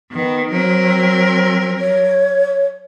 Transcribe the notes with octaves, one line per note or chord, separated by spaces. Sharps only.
D#3 B3
F#3 C4 A#4
C#5